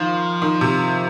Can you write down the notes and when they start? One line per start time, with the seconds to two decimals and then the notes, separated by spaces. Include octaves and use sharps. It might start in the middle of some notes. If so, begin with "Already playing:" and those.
Already playing: D#3 F3
0.42 D#3
0.61 C3